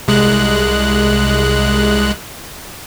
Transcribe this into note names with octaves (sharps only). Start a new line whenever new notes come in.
C2 G#3 F#6